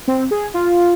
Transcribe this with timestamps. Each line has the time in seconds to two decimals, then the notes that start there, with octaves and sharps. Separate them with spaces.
0.08 C4
0.31 G#4
0.54 F4